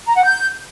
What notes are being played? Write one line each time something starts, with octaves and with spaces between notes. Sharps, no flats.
A#5
F#5
G6